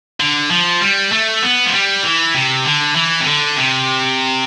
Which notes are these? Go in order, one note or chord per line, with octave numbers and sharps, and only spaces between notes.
D3
F3
G3
A3
B3
F3
G3
E3
C3
D3
E3
C3
D3
C3